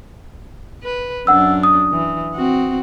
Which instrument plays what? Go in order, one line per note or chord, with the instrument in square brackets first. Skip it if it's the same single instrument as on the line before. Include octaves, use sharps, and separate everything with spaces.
[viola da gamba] B4
[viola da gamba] F#2 D4 [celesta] F#5 E6
[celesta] D#6
[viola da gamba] E3
C4 F#4